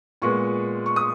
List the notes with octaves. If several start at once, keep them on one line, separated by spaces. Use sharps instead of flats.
A#2 G#3 B3 C#6
C#6
D#6